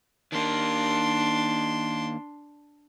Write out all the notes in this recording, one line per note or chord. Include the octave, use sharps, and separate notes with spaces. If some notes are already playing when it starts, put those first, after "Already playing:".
D#3 A#3 D4 C6